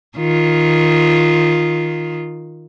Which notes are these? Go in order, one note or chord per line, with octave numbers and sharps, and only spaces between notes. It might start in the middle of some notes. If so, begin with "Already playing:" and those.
D#3 F4